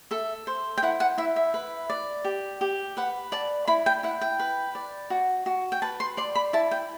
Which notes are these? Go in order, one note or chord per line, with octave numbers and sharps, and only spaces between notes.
A4 E5
C5
G5
E4 F#5
F#5
E4 E5
E5
B4
D5
G4
G4
B4 F#5
D5 A5
E4 B5
G5
E4 F#5
G5
B4
D5
F#4
F#4
G5
B4 A5
C6
D5 C6
B5
E4 A5
G5